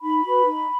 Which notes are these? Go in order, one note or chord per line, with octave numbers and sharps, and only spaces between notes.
D#4 B5
F#4 B4
D#4